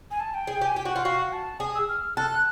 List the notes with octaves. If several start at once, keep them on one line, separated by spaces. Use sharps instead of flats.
G#5
A5
G5
G#4
G4
G#5
G4 G5
F#4
F4 F#5
F#4 F5
F#5
A5
G#4 D#6
E6
F6
A4 F#6